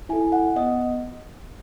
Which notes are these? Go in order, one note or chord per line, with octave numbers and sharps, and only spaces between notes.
E4 A4 G#5
F#5
B3 D#5